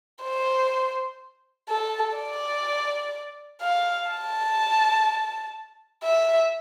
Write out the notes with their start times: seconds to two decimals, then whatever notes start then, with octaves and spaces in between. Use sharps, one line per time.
0.23 C5
1.69 A4
2.17 D5
3.61 F5
4.10 A5
6.03 E5